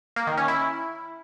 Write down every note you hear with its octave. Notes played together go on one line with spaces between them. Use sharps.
A#3
D#3
C#4
E4